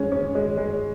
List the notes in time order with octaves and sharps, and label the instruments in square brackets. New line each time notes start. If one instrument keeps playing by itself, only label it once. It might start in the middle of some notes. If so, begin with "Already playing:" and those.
Already playing: [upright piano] G#3 C#4
C#4
G#3
G#3